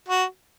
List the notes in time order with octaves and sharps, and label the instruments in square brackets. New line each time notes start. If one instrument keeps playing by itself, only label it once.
[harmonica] F#4